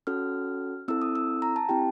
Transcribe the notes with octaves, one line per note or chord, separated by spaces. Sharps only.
C#4 F#4 A4 F6
C4 E4 A4 E6
D#6
E6
A#5
A5
C4 E4 G4 G5